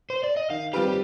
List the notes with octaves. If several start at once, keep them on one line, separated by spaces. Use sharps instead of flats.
C5
D5
D#5
D#3 F5
G3 C4 F4 G4 B4
G4